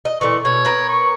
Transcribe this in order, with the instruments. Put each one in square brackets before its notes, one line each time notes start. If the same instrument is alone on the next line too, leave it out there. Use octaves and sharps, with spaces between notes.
[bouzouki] D#5
[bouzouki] A#2 D3 E3 [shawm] C#6
[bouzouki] B2 [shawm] C#5
[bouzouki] B3 A#4 B4
[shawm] C#6